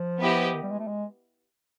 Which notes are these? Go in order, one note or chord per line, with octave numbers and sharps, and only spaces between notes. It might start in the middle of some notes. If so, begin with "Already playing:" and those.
Already playing: F3
B3 E4 G4 B4 D#5
D#3
G3
G#3
A3
G#3